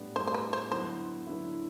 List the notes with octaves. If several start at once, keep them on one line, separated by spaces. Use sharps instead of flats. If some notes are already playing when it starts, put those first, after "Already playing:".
Already playing: A2 G3 B3 D4
A2 G3 B3 D4 C5
C5
B4
C5
D3 F#3 B3 E4 C5
D3 F#3 B3 E4